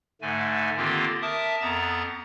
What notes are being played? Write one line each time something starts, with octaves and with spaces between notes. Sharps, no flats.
G#2 D3 A3 G#5
D3 D#3 A#3 C4 F4 G4
A#4 E5 A5 D6 D#6
F2 B3 A#5 A6